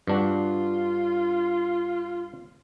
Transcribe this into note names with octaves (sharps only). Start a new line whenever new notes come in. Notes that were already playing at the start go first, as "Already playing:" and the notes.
G2 D4 F4 F#4